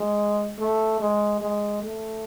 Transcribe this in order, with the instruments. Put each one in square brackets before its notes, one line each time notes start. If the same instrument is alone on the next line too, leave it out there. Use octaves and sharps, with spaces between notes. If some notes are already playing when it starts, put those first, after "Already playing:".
Already playing: [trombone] G#3
A3
G#3
G#3
A3